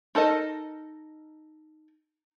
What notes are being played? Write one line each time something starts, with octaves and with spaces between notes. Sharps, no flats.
D#4 A4 A#4 D#5